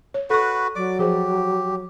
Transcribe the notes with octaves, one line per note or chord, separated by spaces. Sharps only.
C#5
F#4 A4 B4 C#6
F#3 D5 D6
F3 G4 G#4 C5